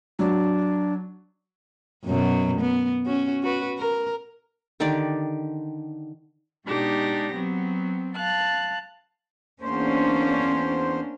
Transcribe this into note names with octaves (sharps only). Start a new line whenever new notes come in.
F#3 D4 F#4
F#2 B2 F#3
B3
C#4 F#4
F#4 B4
A#4
D3 D#3 G4 D5
B2 G#3 D4 D#4 G4 A#6
F#3 B3 C4
F5 A5 F#6
E2 A#3 C#4 D4 C5